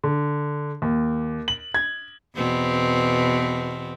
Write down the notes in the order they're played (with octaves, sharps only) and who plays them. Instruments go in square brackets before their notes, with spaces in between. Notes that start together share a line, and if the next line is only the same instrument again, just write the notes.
[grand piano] D3
D#2
F#7
G#6
[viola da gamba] E2 B2 C4